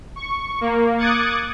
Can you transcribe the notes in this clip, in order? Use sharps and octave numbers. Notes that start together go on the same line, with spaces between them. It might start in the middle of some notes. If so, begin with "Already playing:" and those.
C#6
A#3
D6 D#6 F#6 G#6 A6 C#7